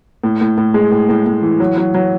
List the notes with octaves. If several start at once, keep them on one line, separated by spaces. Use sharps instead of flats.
A2
A2
A2
G#3
A2
A2
A2
E3
F#3
F#3
F#3